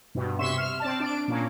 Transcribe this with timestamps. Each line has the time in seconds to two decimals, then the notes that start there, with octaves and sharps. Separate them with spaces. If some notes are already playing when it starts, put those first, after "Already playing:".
0.15 G2 B2
0.39 C3 E5 C6 C#6 E7
0.58 F6
0.80 C4 D5 A5
1.00 D4 D7
1.28 A#2 A#3 C#4